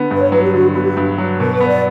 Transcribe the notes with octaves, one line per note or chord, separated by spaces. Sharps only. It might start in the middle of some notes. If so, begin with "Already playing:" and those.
Already playing: D3 B3
G2 B4
C#5
F#3 B4
G4
D3 F#4
B3 F#4
G4
G2
F#3
B2 A#4
B4
B3
D5